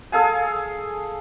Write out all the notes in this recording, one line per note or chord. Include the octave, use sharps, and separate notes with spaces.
G#4 A4 F5 G#5